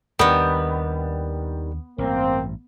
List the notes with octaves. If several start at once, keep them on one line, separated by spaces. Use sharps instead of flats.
D#2 D#3 G3 B3 D4
A1 G2 A#3 C4